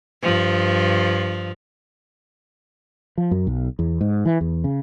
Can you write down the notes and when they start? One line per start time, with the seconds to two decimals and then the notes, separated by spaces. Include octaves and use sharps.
0.23 G2 F3
3.18 F3
3.31 F#2
3.47 B1
3.79 E2
4.01 G#2
4.25 E3
4.41 E2
4.64 C#3